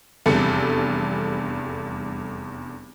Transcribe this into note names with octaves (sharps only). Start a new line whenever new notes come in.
F1 E2 G2 A4 C#7